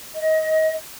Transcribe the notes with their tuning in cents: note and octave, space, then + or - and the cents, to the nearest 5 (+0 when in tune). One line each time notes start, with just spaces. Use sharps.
D#5 +25